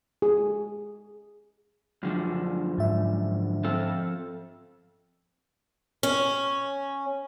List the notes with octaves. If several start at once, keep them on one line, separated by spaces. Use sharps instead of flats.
G#4
F#2 D3 F3
G#2 E5
F3 C4 A4
C#4